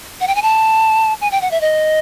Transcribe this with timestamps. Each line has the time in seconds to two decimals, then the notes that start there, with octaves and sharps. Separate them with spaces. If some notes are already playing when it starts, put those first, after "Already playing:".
0.21 F#5
0.27 G5
0.36 G#5
0.42 A5
1.21 G#5
1.31 G5
1.42 F#5
1.51 E5
1.61 D#5